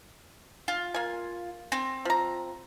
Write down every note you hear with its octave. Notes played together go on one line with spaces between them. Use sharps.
F4
A#3 G#5
C4
F3 A#5